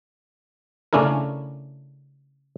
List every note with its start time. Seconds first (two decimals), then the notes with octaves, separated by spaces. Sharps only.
0.93 C#3 A3 C#4 D4 E4 A#4